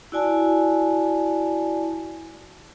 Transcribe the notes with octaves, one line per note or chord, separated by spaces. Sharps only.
E4 F#4 D5 G#5 A5